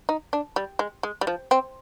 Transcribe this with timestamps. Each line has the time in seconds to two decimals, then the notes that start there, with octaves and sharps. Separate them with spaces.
0.09 D#4
0.33 D4
0.56 G3
0.79 G#3
1.03 G#3
1.21 G3
1.27 F3
1.51 C4